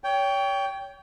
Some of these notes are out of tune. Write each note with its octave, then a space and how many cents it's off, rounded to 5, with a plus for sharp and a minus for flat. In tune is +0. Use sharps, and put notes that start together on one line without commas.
C#5 +30 G5 +0